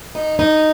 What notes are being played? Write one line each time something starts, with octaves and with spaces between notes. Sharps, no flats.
D#4
D#4